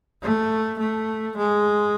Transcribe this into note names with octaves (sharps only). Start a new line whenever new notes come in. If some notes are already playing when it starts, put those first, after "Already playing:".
A3
A3
G#3